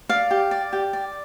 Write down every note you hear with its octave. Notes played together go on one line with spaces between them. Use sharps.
D5 F5
G4
D5
G4
D5